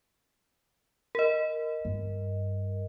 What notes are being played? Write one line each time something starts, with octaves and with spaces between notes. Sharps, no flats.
A#4 D#5
G2